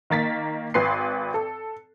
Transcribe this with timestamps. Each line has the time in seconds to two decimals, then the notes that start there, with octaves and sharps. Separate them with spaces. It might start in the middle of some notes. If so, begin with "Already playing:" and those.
0.10 D#3 A#3 A6 B6
0.74 G#1 B4 C6 C7
1.34 A4